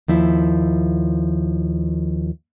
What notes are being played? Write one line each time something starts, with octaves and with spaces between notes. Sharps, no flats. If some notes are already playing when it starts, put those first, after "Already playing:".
D#2 F3 E4 E5